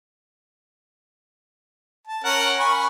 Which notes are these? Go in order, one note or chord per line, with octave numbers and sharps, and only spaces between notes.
A5
C#4 A#4 F#5
G#5 B5 C#6